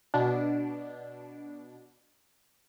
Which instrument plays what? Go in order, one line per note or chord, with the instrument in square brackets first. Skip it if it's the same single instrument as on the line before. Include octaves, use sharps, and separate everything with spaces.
[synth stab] B2 D4